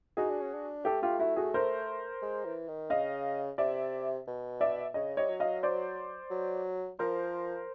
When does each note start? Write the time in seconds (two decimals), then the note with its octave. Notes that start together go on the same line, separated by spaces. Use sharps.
0.17 D#4 F#4 G#4
0.30 D4
0.42 C#4
0.54 D4
0.85 A3 G4 A4
1.02 F4 G4
1.19 E4 F#4
1.36 F#4 G#4
1.54 A#4 C5
2.22 G#3
2.45 E3
2.68 D#3
2.90 C#3 D#5 F5
3.58 C3 D5 E5
4.27 B2
4.61 D5 E5
4.94 C#3 C#5 D#5
5.17 G3 C#5 D#5
5.29 F#3
5.40 D#5 F5
5.63 C5 D5
6.31 F#3
6.99 F3 A#4 C5